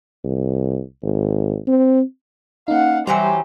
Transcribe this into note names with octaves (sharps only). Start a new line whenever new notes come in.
C2
G#1
C4
A#3 C#4 D#4 F5 F#5
E3 F#3 G3 G4 C5 A#5